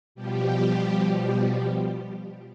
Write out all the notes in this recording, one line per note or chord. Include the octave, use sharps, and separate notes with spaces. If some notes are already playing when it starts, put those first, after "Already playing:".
B2 F3 G3 G4